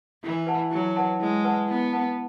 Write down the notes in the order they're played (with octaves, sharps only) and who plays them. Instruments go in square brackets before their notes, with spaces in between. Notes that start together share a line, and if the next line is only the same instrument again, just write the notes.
[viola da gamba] E3 [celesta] E4
[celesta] B4 F#5 A5
[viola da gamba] F#3 [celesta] E4
[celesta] B4 F#5 A5
[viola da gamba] G#3 [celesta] E4
[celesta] B4 F#5 A5
[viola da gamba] B3 [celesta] E4
[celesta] B4 F#5 A5